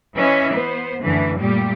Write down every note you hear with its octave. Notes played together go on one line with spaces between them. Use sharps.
E3 C#4 B4 D#5 E5
B3 C5
F#2 D3 E3 A3
A#2 G3 A3 G4